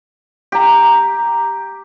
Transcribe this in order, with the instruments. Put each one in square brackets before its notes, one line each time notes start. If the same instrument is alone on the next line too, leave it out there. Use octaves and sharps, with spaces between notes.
[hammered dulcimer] G4 A#5